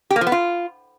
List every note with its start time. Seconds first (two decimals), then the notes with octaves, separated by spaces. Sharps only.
0.10 G4
0.16 A#3
0.21 F3
0.27 B3
0.32 F4